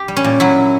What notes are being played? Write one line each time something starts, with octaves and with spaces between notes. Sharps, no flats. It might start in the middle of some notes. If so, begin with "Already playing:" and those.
Already playing: G4
G3
C#4
A#2
F#3 E4